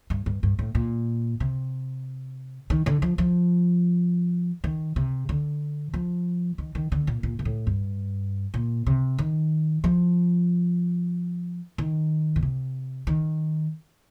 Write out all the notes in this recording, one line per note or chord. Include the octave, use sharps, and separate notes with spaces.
G2
G2
G2
A2
A#2
C3
D#3
D3
F3
F3
D#3
C3
D3
F3
D#3
D#3
D3
A#2
A#2
A#2
A2
G2
A#2
C3
D#3
F3
D#3
A#2
C3
D#3